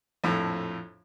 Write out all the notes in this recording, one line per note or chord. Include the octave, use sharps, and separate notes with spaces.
A#1 F2 A2